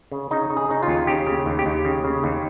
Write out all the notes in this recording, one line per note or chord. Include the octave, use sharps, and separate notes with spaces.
C#3
C#3 D#4
C#3
G#4
C#3 D#4
F4
D#2
C#3 G4
C#3
D#2
G4
D#2
C#3
C#3
D#2